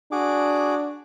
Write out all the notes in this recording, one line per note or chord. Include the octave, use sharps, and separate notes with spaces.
D4 F#4 G#4 D6